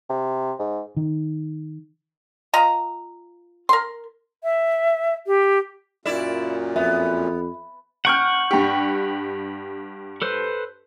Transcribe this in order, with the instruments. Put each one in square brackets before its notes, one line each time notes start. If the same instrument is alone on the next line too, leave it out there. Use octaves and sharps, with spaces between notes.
[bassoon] C3
G#2
[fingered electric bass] D#3
[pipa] F4 D#5 A#5
A#4 C6
[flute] E5
G4
[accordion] F#2 A#2 [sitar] E4 D5 E5
[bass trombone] F2 [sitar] B3 [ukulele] E5
[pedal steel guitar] F#5 C#6 [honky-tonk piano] F6 G6 D7
[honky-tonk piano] G2 G4
[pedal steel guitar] A4 B4 C5